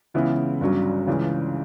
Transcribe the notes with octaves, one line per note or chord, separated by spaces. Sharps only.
C#2 C#3 E3 B3 E4
G1 G2 F#3 C#4
C#2 C#3 E3